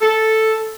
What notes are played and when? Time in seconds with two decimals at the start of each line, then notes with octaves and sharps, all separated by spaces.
0.01 A4